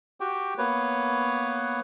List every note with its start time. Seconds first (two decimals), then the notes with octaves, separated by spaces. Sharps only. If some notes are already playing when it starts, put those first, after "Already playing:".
0.20 F#4 G4 G5
0.58 A#3 B3 B4 C#5